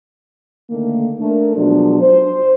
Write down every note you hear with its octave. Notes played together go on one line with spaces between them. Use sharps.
D3 D#3 A3 A#3
A3 D4 A#4
B2 F3 F#3 G#3 D4
C5